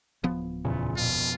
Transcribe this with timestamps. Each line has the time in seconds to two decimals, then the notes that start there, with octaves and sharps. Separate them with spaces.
0.24 D1 F3 B3
0.65 E2 A#2 C#3
0.97 F2 B2 F4